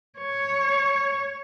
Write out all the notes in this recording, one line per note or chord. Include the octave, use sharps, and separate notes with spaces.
C#5